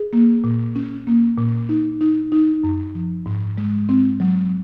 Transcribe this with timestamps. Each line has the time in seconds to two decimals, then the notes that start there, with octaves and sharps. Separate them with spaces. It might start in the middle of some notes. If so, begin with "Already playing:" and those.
Already playing: G#4
0.13 A#3
0.44 A#2
0.76 C#4
1.07 A#3
1.38 A#2
1.69 D#4
2.01 D#4
2.32 D#4
2.64 F#2
2.95 F3
3.26 G#2
3.58 G#3
3.89 C4
4.20 F#3